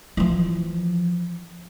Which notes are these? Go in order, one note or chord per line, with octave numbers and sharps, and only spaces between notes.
E3 F3